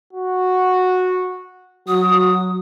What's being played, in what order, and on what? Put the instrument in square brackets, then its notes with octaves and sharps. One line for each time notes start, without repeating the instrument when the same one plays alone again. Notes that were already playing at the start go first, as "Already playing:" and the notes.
[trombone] F#4
[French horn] F#3 [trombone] F#4 [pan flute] D#6